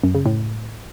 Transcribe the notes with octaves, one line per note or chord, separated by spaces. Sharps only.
F#2
C#3
A2